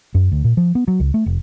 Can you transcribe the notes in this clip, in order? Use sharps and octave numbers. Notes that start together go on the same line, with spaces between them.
F#2
D2
A#2
F3
B3
F#3
C#2
A3
F1